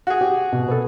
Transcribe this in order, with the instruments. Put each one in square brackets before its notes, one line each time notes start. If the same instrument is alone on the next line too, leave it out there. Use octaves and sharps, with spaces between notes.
[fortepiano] F#4 G#4
[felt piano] G4
B2
B3 A4